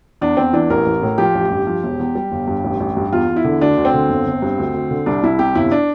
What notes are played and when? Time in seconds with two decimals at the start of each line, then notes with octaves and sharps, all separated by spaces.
0.21 E2 D4
0.37 E2 C4
0.53 E3 D4
0.70 A1 A#4
0.86 A1
1.02 A2
1.18 F3 G4
1.35 A1
1.50 G2
1.67 F3
1.83 E1
1.99 E2
2.15 G3
2.32 G1
2.47 G2
2.64 A1
2.80 A1
2.97 G2
3.12 E2 F4
3.29 E2
3.36 E4
3.44 D3
3.61 D2 D4
3.77 D2
3.85 C4
3.94 D3
4.09 G1
4.26 G1
4.42 G2
4.58 D2
4.74 D2
4.91 D3
5.06 C2 D4
5.23 C2 E4
5.39 C3 G4
5.55 G1 E4
5.71 D4